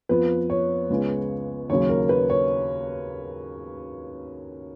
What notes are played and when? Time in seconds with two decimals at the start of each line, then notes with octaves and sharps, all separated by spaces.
0.09 F2 F3 B3 B4
0.50 C#5
0.90 C#2 C#3 G#3 B3
1.70 D#2 C#3 F#3 C#5
1.89 A#4
2.09 B4
2.30 C#5